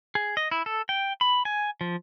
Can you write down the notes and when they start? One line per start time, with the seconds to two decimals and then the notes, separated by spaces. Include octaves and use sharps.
0.15 G#4
0.37 D#5
0.51 E4
0.66 A4
0.89 G5
1.21 B5
1.45 G#5
1.81 F3